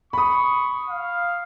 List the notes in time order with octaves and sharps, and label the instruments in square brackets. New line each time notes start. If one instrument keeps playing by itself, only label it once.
[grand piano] B5 D#6 [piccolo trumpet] C#6
[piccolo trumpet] F5